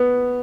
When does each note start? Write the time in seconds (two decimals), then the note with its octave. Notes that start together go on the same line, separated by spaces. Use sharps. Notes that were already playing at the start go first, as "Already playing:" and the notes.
Already playing: B3